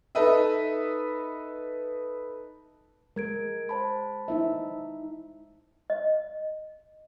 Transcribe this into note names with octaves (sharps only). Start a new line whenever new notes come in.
D#4 A4 B4 D#5 E5
G#3 A#4 G#6 D7
C5 A5 B5
D#4 E4 E5
D#5